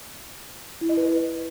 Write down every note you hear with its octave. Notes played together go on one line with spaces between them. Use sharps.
E4
D#5
B4